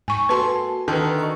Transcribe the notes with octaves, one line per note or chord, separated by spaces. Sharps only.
G#2 G#5 C#6
A#3 F#4 A4 B4 G#5 A5 C6
D3 D#3 B4 A5
D#5 A#5 C#6